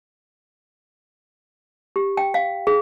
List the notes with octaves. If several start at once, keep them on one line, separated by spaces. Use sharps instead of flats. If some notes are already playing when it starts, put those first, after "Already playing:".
G4
G5
F5
G#4